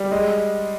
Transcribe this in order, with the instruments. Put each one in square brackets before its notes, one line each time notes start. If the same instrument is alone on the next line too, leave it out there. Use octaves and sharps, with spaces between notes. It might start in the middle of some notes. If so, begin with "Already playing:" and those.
Already playing: [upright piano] G3
[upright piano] G#3 [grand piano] D#5